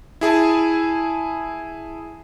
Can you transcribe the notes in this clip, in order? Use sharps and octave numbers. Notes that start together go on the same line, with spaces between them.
E4 G#4 G#5 A5